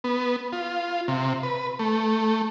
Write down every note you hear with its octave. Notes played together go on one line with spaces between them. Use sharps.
B3
F4
C3
B4
A3